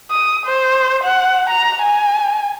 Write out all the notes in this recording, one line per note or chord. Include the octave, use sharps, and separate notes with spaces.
D#6
C5
F#5
A#5
G#5